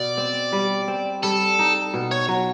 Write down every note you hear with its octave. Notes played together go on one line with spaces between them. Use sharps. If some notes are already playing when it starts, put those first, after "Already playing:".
Already playing: B2 D5
C4
G3
C4
G3 A4
D#4
B2
C#5
F#3